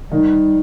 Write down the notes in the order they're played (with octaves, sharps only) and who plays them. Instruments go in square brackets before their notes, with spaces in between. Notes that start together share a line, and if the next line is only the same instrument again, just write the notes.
[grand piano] D#3 [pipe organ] G3